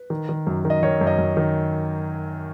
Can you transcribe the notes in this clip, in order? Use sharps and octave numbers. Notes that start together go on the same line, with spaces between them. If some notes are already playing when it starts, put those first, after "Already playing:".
Already playing: B4
D#3
D#3
F#2
D#3
D#5
D#3 C#5
F#2
D#5
F#2
D#3